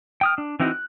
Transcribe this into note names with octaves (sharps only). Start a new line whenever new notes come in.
G5 D#6 F6
D4
E3 C4 D#4 E4 F#4
F#6